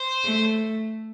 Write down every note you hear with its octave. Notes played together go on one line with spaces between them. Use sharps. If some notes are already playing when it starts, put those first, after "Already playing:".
Already playing: C5
A3